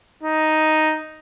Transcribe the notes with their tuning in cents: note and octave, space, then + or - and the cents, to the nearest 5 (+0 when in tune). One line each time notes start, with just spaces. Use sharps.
D#4 +0